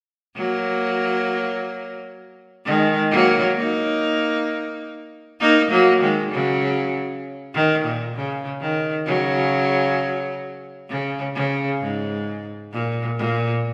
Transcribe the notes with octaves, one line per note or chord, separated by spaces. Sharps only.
F#3 A#3
D#3 G#3
F#3 A#3
A#3 D#4
A#3 D#4
F#3 A#3
D#3 G#3
C#3 F#3
D#3
A#2
C#3
D#3
C#3 F#3
C#3
C#3
G#2
A#2
A#2